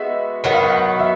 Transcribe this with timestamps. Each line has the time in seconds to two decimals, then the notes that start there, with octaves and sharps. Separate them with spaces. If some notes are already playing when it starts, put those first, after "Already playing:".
Already playing: G#3 B3 D#4 F#4 E5
0.44 D#3 F#3 B3 F#5
0.53 F5
0.63 F#5
0.99 E5